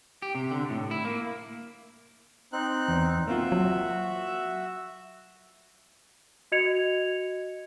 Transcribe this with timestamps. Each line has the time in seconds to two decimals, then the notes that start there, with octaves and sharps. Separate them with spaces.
0.22 G4
0.35 C3
0.51 D3
0.70 A2
0.91 E4
1.05 A#3
2.53 C4 D#4 F#6
2.88 E2
3.28 A#3 C4 F4 F#4 E5
3.52 F#3
6.52 F#4 D#5 G#6 C#7 F7